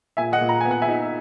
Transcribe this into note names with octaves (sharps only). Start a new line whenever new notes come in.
A#2 E5 G#5
D#5 F#5
A#2
A#5
B3 G#5
F#5
E5 G#5
D#4